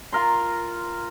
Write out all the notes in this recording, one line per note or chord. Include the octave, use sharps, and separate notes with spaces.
F4 A#4 C6